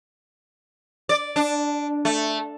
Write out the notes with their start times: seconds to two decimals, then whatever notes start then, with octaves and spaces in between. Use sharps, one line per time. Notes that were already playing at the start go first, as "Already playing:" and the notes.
1.09 D5
1.36 D4
2.05 A3